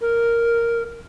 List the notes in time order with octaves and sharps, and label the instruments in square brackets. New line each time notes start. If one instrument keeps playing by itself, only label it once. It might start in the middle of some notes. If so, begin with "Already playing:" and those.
[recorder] A#4